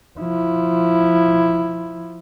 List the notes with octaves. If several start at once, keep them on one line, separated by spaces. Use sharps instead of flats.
F3 E4